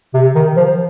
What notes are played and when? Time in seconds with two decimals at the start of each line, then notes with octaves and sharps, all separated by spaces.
0.14 C3
0.35 D#3
0.57 F3